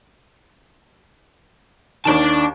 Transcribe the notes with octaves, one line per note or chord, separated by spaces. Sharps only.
D#2 D#3 D4 D5 A5